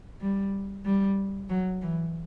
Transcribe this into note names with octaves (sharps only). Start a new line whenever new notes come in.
G3
G3
F#3
E3